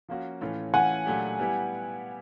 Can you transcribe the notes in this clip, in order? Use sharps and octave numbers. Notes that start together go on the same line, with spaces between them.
F3 A#3 C#4 F#4
A2 E3 A3 C#4 F4
E3 A3 C#4 F4 F#5 G#5
A#2 F#3 A3 D4 G4
G3 B3 E4 G4